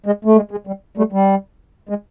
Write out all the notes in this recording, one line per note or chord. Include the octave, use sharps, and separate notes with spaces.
G#3
A3
G#3
G#3
G3
G3 A3
G3
G#3